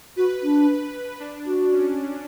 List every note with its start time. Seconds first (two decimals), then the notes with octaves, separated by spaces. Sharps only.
0.17 F#4 B4
0.43 D4
1.20 D4
1.46 F#4
1.72 C#4